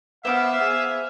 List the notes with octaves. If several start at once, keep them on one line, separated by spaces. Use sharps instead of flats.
B3 C5 E5 F5 D6 F6
G#4